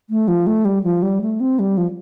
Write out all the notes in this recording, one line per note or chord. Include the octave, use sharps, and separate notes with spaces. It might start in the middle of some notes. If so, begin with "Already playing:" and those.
A3
F3
A3
G3
F3
G3
A3
C4
G3
F3